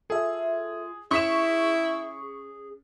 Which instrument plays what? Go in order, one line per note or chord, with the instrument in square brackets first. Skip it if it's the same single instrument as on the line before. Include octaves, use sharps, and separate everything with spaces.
[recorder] F4 [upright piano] G#4 [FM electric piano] A4 E5
[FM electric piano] C#4 [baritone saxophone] E4 [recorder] G#4 [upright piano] C#6 B6 E7